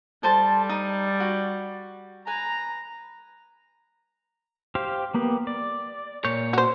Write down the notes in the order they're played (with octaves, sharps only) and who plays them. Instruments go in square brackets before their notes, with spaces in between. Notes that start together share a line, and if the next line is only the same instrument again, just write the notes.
[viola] G3 [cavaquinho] A4 C5 A5
[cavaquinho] D#4
F#4
[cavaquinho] B4 G#5 [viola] A#5
[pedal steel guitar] G4 C5 F5
A#3 B3 G4
D5
[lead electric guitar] A#2 C#5 [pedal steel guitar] G6
[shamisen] F#4 C5